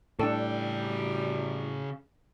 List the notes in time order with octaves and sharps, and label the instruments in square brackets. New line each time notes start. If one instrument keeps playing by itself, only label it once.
[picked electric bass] A2 [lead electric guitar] C#3 G5 [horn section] G3 [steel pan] D4 A4